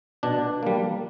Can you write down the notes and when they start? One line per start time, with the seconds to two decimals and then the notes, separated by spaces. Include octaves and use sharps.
0.23 B2 D4
0.63 G3 A#3